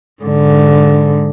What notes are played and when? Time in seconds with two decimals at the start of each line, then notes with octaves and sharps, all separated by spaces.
0.23 G#2 D3